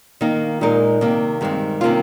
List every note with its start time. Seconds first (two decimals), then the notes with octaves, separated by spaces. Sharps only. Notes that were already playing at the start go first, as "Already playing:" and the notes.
0.21 D#3 A#3 D#4
0.61 A#2 G#3 D#4 A#4
1.01 C3 D#3 A#3
1.41 G2 D#3 G#3 C4
1.81 C3 D#3 A#3 C#4 F4